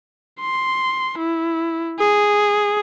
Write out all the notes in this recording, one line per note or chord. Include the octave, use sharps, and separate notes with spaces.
C6
E4
G#4